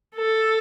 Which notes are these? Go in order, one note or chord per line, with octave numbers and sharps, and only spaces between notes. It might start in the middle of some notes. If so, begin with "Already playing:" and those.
A4